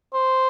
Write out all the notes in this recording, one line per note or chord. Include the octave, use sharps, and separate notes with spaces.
C5